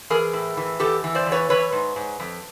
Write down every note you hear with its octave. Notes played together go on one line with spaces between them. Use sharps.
E3 G#4 A#4
A2
E3
E2 G4 A4
E3
C5 D5
E2
B4 C#5
E3 B4 C#5
G#2
G#2
F2